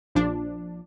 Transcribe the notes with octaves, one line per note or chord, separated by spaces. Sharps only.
A#1 F3 D4